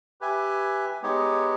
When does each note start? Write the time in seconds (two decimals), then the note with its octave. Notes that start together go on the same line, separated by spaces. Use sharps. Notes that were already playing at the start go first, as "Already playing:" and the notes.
0.21 G4 B4 E5 G#5
1.02 G#3 B3 D#4 G4 C#5